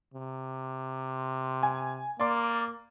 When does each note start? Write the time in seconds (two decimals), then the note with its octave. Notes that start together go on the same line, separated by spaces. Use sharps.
0.14 C3
1.63 G#5
2.20 A#3 D5 C6 D6